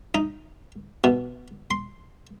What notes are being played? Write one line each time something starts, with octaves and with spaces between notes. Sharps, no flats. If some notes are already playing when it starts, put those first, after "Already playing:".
D#4
B2
C6